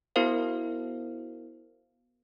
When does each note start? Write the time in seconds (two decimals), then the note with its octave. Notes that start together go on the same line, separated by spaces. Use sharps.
0.16 B3 E4 F#4 A#4 C5 F5